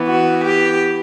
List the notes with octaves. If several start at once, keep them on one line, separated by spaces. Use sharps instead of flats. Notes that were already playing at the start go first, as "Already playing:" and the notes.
Already playing: E3 B3
F#4
G4